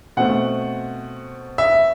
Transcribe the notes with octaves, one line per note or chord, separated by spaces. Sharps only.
B2 A3 C4 F#5
E5